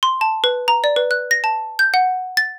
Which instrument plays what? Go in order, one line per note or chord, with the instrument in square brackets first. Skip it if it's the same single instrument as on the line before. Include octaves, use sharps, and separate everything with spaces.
[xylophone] C6
A5
B4
A#5
D5
B4
F#6
A#6
A5
G6
F#5
A6